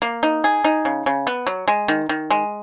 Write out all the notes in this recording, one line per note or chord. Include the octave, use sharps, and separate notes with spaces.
A#3
D#4
G#4
D#4
C#3
C#3
B3
F#3
G#3
D#3
D#3
G#3